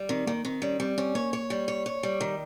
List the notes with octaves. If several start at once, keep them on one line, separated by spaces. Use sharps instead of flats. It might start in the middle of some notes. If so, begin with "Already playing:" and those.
Already playing: G3
D#3 C4
D#3 A#3
D#3 C4
G3 C#4
G3 C4
C4 C#4
A#3 C#5
C#5
G3
C#5
C#5
G3
D#3